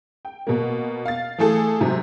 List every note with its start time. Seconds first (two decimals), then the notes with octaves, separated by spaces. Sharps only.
0.25 G5
0.47 B2 A#3
1.05 F5 A6
1.38 E3 A3 G#4 A4
1.80 G#2 C3 F#3